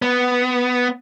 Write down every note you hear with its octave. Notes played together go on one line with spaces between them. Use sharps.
B3